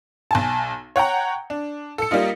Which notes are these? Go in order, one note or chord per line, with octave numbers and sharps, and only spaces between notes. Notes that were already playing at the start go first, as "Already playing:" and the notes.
B1 G#5 A5
C#5 F#5 G5 A#5
D4
A4 C#7
G3 A#3 D#4 F4